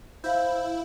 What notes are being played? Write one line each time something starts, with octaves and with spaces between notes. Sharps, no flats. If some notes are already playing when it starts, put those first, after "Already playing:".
E4 C5 F5 G6